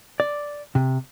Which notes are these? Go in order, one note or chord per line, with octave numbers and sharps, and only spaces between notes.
D5
C3